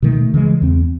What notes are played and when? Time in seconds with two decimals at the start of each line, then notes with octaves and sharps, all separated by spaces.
0.02 B2 D#3 A3
0.34 C#3 E3 G#3
0.62 E2 C4